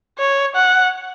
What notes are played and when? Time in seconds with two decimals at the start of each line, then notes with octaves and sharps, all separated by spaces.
0.19 C#5
0.56 F#5